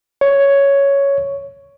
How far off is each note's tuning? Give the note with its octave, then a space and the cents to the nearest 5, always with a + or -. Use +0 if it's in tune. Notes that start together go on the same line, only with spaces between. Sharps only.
C#5 +5